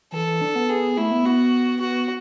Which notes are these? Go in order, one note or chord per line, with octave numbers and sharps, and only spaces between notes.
E3 A4
E3
D4
B3
B3 G#4
A3 E4
B3
B3 F#4
F#4